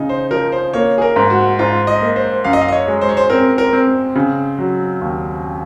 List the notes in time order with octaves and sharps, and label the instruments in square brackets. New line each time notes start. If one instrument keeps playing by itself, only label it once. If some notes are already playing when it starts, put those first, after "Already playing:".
Already playing: [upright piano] C#3 D#4
[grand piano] C5
[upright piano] F3 [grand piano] A#4
[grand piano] C5
[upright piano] A#3 [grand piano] C#5
[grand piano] G#4
A#4
[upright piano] G#2
[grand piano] F#4
[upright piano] G#2 [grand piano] F4
[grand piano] D#5
[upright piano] A#3
[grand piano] C5
[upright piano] F#2 [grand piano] F5
[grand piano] D#5
F5
D#5
C#5
[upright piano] G#3
[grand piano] C5
C#5
C5
[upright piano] C4 [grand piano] A#4
[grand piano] A#4
[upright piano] C4
C#3
F#3
D#2